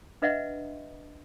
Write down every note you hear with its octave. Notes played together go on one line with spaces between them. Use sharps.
D4 B4 D#5 E5 F#5